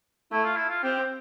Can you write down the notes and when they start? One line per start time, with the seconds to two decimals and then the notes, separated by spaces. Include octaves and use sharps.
0.32 A3 E4
0.45 F4
0.57 E4
0.69 F4
0.83 C4 G4